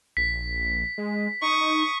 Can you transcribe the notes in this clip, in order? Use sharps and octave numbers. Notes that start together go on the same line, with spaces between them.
A#1 B6
G#3
D#4 C#6 D#6